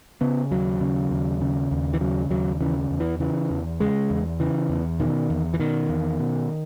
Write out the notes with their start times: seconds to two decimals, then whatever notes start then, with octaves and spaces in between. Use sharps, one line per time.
0.21 C#3 B3
0.51 D#2 F#3
0.81 C#3
1.11 D#2
1.41 C#3
1.71 D#2
1.93 E3
2.00 C#3 F#3
2.30 D#2 F#3
2.61 C#3 E3
2.91 E2
3.00 E3
3.20 C#3 E3
3.50 E2
3.80 C#3 G#3
4.10 E2
4.40 C#3 E3
4.69 E2
5.00 B2 D#3
5.30 E2
5.54 E3
5.60 B2 D#3
5.89 E2
6.19 B2